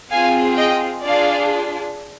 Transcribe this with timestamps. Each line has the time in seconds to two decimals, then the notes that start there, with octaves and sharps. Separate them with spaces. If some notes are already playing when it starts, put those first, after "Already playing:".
0.11 C4 F4 G#4 F5 G#5
0.57 D#5 G5
1.04 D4 F4 G#4 D5 F5